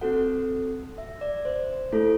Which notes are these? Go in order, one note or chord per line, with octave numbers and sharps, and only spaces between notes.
C4 F#4 A4 F#5
E5
D5
C5
A3 E4 A4